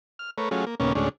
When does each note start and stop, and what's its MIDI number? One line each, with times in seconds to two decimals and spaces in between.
0.19 0.30 89
0.38 0.49 57
0.38 0.49 70
0.38 0.49 71
0.38 0.49 73
0.51 0.65 54
0.51 0.65 57
0.51 0.65 61
0.51 0.65 65
0.51 0.65 68
0.67 0.75 58
0.80 0.93 39
0.80 0.93 46
0.80 0.93 49
0.80 0.93 58
0.80 0.93 59
0.80 0.93 61
0.95 1.09 38
0.95 1.09 45
0.95 1.09 56
0.95 1.09 61
0.95 1.09 62